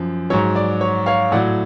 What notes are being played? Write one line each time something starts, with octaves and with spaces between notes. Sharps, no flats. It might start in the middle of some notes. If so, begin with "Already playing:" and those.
Already playing: F#2 F3
G#2 F#3 C#5
D5
C#5
C#5 F5
A2 F#3 D5 F#5